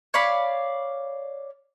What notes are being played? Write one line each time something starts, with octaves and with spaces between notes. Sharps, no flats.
C#5 D5 F5 B5